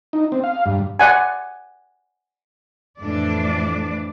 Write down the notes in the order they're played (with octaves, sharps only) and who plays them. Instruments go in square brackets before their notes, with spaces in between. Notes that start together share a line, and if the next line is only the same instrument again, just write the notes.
[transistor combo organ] D#4
C4
F5
G2
[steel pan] D5 F#5 G#5
[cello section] F2 A2 E3 D4 D5